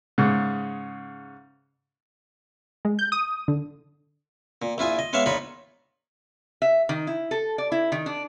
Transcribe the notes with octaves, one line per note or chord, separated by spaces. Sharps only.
G#2 C#3
G#3
G6
D#6
D3
A#2
A#1 E4 F4 G#5 D#6
D#5
G#3 B3 C#5 E5 F5
A#1 D#4 F4 C#5 B5
E5
D#3
E4
A4
D5
E4
D#3
D4